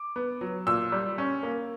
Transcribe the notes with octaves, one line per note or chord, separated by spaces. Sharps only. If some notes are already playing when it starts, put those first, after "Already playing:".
Already playing: D6
B3
F#3
A#2 E6
G3
C#4
A#3